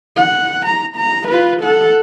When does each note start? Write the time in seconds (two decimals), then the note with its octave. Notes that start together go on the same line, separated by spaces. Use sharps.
0.17 F#5
0.66 A#5
0.97 A#5
1.28 F4 B4
1.61 A4 F#5